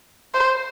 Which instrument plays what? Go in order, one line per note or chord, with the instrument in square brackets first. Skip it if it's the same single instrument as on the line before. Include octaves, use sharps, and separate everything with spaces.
[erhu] C5